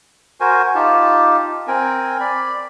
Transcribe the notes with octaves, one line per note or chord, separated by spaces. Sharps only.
F#4 A#4 C5 G#5
D#4 F4 G4 A5
C4 A#4 G5 G#5
D5 B5